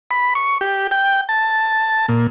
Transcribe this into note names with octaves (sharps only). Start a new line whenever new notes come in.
B5
C#6
G4
G5
A5
A#2